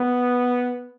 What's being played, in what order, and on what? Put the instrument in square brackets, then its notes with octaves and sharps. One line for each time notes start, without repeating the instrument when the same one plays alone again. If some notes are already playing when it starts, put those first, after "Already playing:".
Already playing: [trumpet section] B3